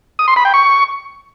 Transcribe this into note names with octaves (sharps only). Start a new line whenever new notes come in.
D#6
C6
B5
G5
C#6